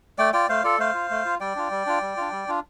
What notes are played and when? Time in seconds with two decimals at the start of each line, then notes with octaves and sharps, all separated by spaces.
0.18 A3 D5 G5
0.33 F4 D5 G5
0.49 A3 C5 F5
0.64 F4 A4 D5
0.79 A3 C5 F5
0.94 F4
1.11 A3
1.26 F4
1.40 G3 D5 G5
1.56 D4 F4
1.71 G3
1.87 D4 F4
2.02 G3
2.17 D4 F4
2.32 G3
2.48 D4 F4